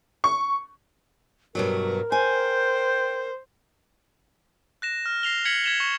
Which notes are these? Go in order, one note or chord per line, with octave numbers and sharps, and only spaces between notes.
C#6
G2 B2 F#3 A#4
C5 G5 G#5
F#6 A#6 E7
F6
A#6 C7 F7 G7
G#6 B6 C#7 F#7
G#6 B6 E7 F7 G7
C#6